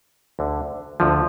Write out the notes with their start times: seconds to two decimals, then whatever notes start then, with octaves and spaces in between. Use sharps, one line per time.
0.39 D2 D3
1.00 D2 D3 F3